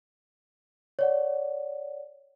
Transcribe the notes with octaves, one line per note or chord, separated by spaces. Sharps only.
C#5 D5 F#5